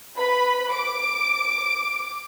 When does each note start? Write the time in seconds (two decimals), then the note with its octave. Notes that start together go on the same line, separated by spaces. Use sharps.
0.17 B4 B5
0.71 D6 D7